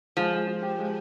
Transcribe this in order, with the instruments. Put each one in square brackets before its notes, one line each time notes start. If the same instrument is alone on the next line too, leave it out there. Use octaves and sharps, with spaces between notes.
[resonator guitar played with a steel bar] F3 [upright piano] G#3
[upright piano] G#3
F4
G4
G#3